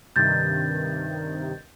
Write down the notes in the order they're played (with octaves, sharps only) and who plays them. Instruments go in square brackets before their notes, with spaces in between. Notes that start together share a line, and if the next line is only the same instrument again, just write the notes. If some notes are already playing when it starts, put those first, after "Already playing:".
[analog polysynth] G2 C3 D#3 [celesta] G6 A6